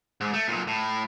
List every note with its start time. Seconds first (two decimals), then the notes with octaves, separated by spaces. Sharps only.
0.21 G#2
0.33 A3
0.48 B1 A#2
0.67 A2